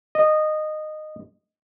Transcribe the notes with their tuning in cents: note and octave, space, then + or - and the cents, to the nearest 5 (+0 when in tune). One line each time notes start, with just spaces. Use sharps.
D#5 -15